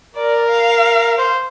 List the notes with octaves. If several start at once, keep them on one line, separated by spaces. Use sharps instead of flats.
A#4 D5
F5
C5